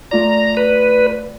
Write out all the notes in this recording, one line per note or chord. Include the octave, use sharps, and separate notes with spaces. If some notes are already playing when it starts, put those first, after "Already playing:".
A3 F4 D5 A#5
B4